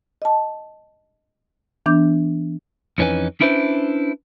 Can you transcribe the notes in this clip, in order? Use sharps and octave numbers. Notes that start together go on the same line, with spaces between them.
D#5 A5
E3 B3 D4 D6 G6
F2 E3 C#4 D#4 B4 G#5
C#4 D4 E4 B4 C5